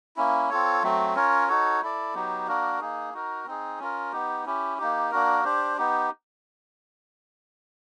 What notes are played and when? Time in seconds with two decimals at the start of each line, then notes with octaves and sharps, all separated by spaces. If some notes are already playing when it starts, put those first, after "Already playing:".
0.17 A#3 C#4 E4
0.50 C4 F4 A4 C#5
0.82 F#3 A3 C4
1.15 C#4 F4 A#4 C#5
1.48 D#4 F#4 A4 C#5
1.82 E4 A4 D5
2.14 F#3 B3 D#4 G4
2.48 A#3 D4 F#4 A#4
2.81 A#3 D#4 G#4
3.14 D#4 F#4 A#4
3.46 C4 D#4 G#4
3.79 C#4 F4 A#4
4.12 B3 D#4 G4
4.46 C#4 E4 G4
4.78 A#3 D#4 G4
5.11 A#3 D4 F#4 A#4
5.44 D4 G4 C5
5.77 B3 D#4 G4